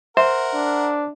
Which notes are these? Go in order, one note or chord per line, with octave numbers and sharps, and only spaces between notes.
A#4 C5 E5 F#5
D4